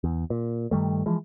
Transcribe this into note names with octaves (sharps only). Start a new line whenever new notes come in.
E2
A#2
G2 D#3 G3 A3
E3 F3 G#3